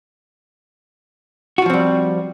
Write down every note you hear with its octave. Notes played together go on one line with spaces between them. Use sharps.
F3 G3 C4 F4 F#4